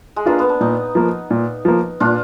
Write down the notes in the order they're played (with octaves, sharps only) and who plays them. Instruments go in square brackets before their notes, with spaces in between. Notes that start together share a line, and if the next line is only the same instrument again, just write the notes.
[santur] G#3
[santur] A#3 [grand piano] D4 F4 B4
[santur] B3
D4
[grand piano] A#2 [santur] D#4
[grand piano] F3 A#3
A#2
F3 A#3
[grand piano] A#2 [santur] D4 F4